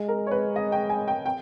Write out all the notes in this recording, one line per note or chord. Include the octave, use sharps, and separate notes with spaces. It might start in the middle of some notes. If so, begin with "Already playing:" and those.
Already playing: G#3
A#4
C#5
B4
D#5
G5
G#5
G5
G5